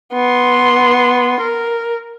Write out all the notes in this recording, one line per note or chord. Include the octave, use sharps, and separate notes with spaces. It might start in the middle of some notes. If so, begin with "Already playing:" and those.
B3 C6
A#4